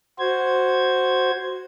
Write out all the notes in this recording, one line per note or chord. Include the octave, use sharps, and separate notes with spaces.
F#4 C5 G#6